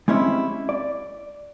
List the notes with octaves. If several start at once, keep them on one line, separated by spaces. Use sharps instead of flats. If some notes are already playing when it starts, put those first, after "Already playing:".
G#3 C4 C#4 E4 G4
D5